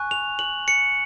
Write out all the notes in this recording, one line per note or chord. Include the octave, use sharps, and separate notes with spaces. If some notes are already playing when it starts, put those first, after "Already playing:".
Already playing: G#5 C#6 F#6
F7
F#7
C#7